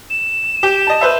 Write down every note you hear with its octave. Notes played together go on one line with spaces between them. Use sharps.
E7
G4
D#5 A5
B4 C5 E5